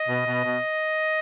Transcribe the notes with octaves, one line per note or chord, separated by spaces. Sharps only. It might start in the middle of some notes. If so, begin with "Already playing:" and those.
Already playing: D#5
B2
B2
B2